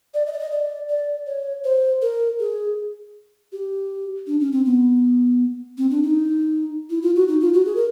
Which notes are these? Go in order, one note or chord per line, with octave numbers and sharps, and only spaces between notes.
D5
D#5
D5
D#5
D5
D5
C#5
C5
A#4
G#4
G4
D4
C#4
C4
B3
C4
D4
D#4
E4
F4
F#4
D#4
F4
F#4
G#4
A#4